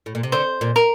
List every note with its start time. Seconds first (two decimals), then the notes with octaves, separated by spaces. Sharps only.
0.06 A2
0.15 A#2
0.23 C3
0.32 D3 C5
0.61 A#2
0.76 A#4